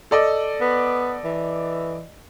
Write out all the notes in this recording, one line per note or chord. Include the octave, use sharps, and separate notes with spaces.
A4 D5 D#5
B3
E3